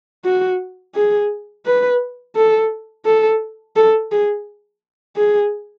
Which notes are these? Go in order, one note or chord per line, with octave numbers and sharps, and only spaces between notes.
F#4
G#4
B4
A4
A4
A4
G#4
G#4